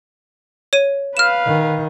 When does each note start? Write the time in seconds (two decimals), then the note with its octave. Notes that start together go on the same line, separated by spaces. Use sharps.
0.73 C#5 D#7
1.17 B4 F5 F6 E7
1.47 D#3